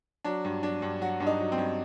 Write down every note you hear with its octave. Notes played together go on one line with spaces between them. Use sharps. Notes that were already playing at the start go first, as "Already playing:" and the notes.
F#3 D4
G2
F#3 D4
G2
F#3 F#4
G2 D4
D#4
F#3
C4
G2